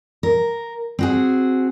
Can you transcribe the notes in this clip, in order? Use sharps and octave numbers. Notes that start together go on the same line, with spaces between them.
A#4
C4 F#4 G#4